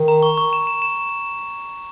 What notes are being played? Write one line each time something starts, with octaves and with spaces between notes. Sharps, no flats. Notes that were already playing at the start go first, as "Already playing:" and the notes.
Already playing: D#3
A#5
C#6
C#6
E7
E7
E7